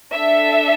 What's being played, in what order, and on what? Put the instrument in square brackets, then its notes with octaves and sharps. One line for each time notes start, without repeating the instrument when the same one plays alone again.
[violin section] D4 A4 E5